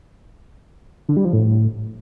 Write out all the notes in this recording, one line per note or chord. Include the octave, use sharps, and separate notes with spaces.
D3
G3
F3
A2